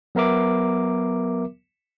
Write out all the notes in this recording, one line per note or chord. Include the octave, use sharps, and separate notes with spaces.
F#3 B3 A#4 E5 D6